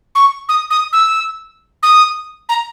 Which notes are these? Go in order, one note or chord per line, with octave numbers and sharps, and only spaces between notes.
C#6
D#6
D#6
E6
D#6
A#5